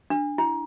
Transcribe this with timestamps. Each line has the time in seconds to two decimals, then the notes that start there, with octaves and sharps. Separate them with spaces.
0.10 D4
0.38 E4